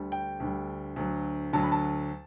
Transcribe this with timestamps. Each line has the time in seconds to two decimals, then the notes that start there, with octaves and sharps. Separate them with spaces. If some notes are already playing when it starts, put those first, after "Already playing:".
Already playing: D2 D3 G3
0.12 G5
0.40 D2 D3 G3
0.96 D2 D3 F#3
1.53 D2 D3 F#3 A5
1.63 B5
1.72 A5